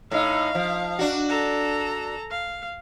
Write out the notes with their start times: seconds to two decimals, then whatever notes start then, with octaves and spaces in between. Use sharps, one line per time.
0.11 A2 D#4 F5
0.55 F3
0.99 D4 F#4
1.29 A4 A#5
2.31 F5